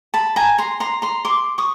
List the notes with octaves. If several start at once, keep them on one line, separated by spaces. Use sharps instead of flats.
A5 B5
G#5 A#5
A#5 C6
A#5 C6
A#5 C6
C6 D6
C#6 D#6